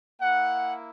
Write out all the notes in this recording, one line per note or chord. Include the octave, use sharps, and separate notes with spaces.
A#3 E4 F#5